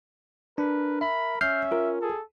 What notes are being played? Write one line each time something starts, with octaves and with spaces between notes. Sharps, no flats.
D4 A#4 B4
E5 B5
C#4 E5 F6 G6 C7
F4 A#4
G#4 A4